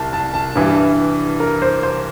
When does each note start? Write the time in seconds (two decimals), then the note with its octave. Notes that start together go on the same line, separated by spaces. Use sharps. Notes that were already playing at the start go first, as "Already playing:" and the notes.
Already playing: C2 A5
0.13 A5
0.34 A5
0.56 G2 E3 G3
1.40 A#4
1.62 C5
1.83 C5